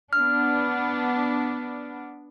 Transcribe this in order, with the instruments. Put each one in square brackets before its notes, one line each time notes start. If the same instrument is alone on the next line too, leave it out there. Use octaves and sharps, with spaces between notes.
[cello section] B3 D4 [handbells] F6